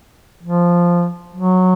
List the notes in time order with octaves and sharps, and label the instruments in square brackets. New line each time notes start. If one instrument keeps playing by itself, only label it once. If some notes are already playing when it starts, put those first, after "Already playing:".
[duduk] F3
F#3